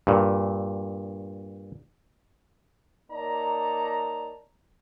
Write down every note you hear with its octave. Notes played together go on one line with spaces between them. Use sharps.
G2 A#2
A#3 D#4 C#5 D5 A5 A#5